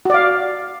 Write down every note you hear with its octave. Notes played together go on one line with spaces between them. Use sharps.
F#4 D5 F5